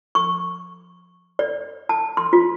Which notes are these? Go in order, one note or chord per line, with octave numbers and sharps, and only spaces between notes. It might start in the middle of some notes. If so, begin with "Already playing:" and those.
C#6
D5
A5
C6
F4